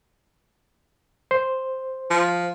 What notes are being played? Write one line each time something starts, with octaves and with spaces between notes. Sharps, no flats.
C5
F3